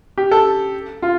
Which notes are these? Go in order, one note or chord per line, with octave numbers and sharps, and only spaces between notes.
G4
A4
F4